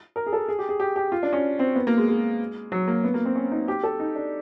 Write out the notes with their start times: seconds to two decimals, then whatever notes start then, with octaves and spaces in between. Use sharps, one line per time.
0.16 A#4
0.26 G#4
0.33 A4
0.48 G#4
0.59 G4
0.69 G#4
0.80 G4
0.96 G4
1.12 F4
1.23 D4
1.33 C#4
1.59 C4
1.76 B3
1.87 A#3
1.97 G#3
2.08 G#3
2.72 F#3
2.88 A#3
3.04 B3
3.14 A#3
3.25 C4
3.36 C#4
3.51 D#4
3.68 G4
3.84 A4
4.00 D#4
4.16 D4